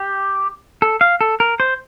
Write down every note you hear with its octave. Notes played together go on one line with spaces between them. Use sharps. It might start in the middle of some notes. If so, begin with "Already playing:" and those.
Already playing: G4
A4
F5
A4
A#4
C5